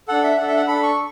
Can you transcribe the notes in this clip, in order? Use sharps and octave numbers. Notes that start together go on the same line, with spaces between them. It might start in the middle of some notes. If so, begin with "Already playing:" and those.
D4 A4 F#5
E5
D4 A4 F#5
E5
F#5
D4 A4 B5
C#6